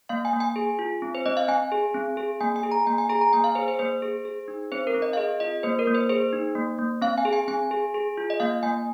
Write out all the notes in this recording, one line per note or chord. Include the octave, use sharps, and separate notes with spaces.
A#3 F5
G#5
A#3
G#5
G#4
F4
C4
C5
C4 D#5
F5
C4 G#5
G#4
C4
G#4
A#3 G#5
G#5
G#4
A#5
A#3 G#5
G#5
G#4 A#5
A#5
A#3 G#5
F5
G#4 C5
C5
A#3 C5
G#4
G#4
D#4
C4 C5
A#4
C4
D#5
F5
G#4 D#5
F4 D#5
A#3 C5
A#4
A#3
C5
G#4 C5
D#4
A#3
A#3
C4 F5
G#5
G#4
G#5
C4 G#5
G#4
G#4
F4
D#5
A#3 F5
A#3 G#5